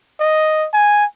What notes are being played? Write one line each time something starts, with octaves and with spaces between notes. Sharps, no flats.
D#5
G#5